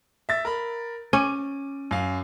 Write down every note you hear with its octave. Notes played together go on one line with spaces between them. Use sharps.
E5 A6
A#4 B5
C#4 D6 D#7
F#2 F5